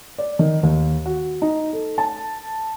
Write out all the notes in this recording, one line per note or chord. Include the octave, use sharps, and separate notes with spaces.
D5
D#3
D#2
F#4
D#4
A4
A5